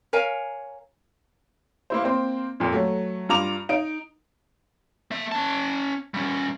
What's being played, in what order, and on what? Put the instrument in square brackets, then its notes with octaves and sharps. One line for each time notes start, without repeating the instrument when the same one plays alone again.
[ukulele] A#4 C#5 F5 G#5
[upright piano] A#3 E4 C5
A#3 C4 C5
F2 A#2
F#3 A3
G2 F4 A#5 D6 F7
D#4 D7
[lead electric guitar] A#3 E5
C#4 A5
G3 C#4